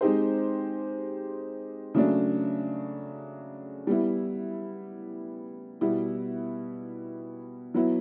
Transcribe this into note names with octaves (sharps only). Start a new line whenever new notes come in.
G#3 C4 D#4 G4 C5
C#3 F#3 A3 D4
G3 B3 E4
B2 G3 B3 E4
F#3 B3 E4